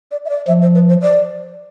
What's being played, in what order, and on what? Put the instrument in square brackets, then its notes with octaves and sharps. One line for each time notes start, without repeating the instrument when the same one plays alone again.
[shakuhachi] D5
E5
D5
[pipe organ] F3 [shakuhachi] E5
[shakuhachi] C5
B4
C5
D5